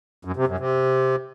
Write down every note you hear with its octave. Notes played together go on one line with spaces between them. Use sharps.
F#2
C3
F#2
C3